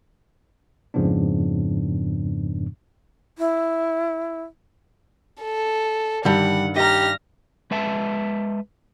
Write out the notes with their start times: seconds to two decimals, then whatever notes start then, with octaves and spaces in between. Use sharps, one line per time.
0.94 F2 G#2 C#3 F3 B3 D4
3.38 E4
5.42 A4
6.25 G2 D3 D#3 G3 F#5
6.76 G4 D#5 A#5 F6 A#6
7.71 G#3 B4 E5 A5